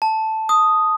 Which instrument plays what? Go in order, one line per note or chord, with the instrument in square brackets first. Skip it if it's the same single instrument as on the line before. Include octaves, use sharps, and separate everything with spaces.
[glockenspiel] A5
D#6